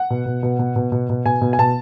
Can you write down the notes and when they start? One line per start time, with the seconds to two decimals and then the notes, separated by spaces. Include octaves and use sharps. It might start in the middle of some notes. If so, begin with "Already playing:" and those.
Already playing: F#5
0.10 B2
0.26 B2
0.43 B2
0.59 B2
0.76 B2
0.92 B2
1.10 B2
1.26 B2 G#5
1.41 B2
1.53 G#5
1.58 B2 A5